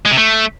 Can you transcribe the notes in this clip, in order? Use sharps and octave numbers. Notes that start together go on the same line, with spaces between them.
G#3
C3
A3